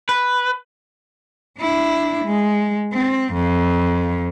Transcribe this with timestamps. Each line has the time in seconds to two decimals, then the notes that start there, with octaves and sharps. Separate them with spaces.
0.09 B4
1.59 D4 E4
2.24 G#3
2.93 C4
3.33 F2